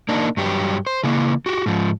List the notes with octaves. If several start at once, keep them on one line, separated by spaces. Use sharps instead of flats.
A#3 D4 D#4
G2 F#3 G4
C5
C#3 E3 A#3
F#4 G4
G#2 F3